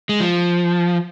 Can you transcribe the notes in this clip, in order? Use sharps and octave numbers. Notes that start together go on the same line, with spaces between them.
G#3
F3